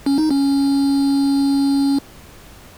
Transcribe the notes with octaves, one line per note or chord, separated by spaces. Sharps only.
C#4
D#4
C#4